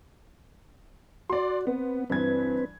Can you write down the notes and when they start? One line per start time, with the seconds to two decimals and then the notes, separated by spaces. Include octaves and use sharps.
1.30 F#4 D5 C6
1.67 B3 C4
2.10 G2 E3 C4 B4 G#6